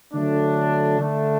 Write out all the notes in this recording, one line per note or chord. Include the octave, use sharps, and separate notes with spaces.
D3 F#3 A3 D4
D3 A3 D4